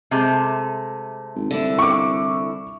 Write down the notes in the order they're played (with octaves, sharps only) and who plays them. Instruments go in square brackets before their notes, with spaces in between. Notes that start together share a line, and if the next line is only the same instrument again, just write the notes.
[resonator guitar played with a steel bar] C3 G#3 A3
[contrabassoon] G#1
[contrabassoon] C2 [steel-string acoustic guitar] D3 E4
[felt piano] C#6 D6